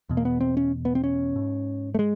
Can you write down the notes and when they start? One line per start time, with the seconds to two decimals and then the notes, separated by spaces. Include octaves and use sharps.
0.09 E2 B2
0.17 A#3
0.25 B3
0.41 C4
0.57 C#4
0.85 B3
0.95 C4
1.04 C#4
1.36 G#2
1.95 A3
1.99 G#3